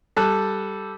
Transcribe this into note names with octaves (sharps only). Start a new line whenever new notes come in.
G3 A4 A5 F#6